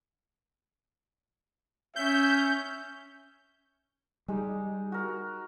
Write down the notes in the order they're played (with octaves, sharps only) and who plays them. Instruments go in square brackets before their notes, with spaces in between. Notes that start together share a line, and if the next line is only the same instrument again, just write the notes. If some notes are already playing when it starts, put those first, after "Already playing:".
[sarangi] C#4 [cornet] E5 [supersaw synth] G6
[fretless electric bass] G3 [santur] G#3 D#4
[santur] F#4 A#4